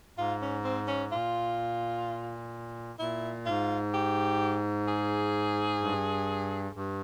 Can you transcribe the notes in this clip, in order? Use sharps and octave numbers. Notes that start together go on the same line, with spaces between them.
G#2 F4
C#4
C4
C#4
A#2 F4
A#2 E4
G#2 F4
G4
G#4
G2
G2